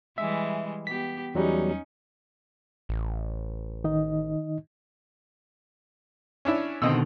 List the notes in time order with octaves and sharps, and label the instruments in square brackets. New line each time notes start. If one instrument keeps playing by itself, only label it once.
[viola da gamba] E3 G3 G#3 [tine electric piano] E5
[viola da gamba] B3 G4 [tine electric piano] B6
[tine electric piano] E2 F#3 G3 [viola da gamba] C#4 D#4
[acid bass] A1
[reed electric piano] D#3 D#4 D#5
[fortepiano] C#4 D4 E4
[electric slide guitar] B2 D3 D#3 [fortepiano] C4 D#5 E6